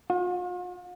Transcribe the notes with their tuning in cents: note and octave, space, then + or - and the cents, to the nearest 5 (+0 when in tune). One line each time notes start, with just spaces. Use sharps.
F4 +45